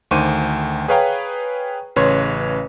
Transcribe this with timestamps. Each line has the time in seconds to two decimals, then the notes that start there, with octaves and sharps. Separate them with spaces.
0.11 D2 D#3 C5 C#6 D6 D#7
0.88 G#4 B4 C#5 F5 G5 A#5
1.96 A1 C#3 B4 C#5 C6